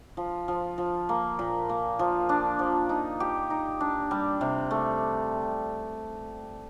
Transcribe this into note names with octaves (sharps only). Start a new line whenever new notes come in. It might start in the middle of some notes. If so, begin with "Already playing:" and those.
F3
F3
F3
A#3
A#2
A#3
F3
D4
F3
D#4
G4
D#4
D4
G3
C3
A3